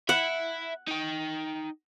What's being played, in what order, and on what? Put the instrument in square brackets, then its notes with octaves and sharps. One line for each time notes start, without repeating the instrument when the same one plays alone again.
[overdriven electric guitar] E5 B5 [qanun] F#5
[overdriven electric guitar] D#4 G5